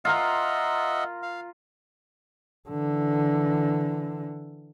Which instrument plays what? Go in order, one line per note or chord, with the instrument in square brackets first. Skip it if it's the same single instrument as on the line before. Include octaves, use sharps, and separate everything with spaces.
[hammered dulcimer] F4 A#4 A#5 [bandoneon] D#5 E5 F#5
[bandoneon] F5
[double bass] D3 E3